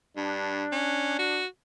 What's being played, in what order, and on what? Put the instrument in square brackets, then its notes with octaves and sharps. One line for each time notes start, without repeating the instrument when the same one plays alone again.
[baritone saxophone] G2 [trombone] D4
[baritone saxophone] C#4
F#4